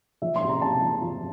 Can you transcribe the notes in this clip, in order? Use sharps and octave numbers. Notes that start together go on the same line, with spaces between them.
F3 E5
C6
C3
A#5
C3 A5
F3
F3